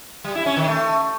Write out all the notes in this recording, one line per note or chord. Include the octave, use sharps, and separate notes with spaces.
G3
E4
C#4
D#3
A3